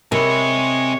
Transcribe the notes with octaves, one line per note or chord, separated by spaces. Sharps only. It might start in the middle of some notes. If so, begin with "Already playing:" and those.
C3 G#4 A#4 C#5 D#5 B5